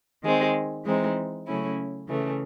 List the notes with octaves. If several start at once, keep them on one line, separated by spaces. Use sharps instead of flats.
D#3 G#3 C4
E3 G#3 C4 D#4
C#3 F#3 A3 C#4 E4
C#3 E3 A3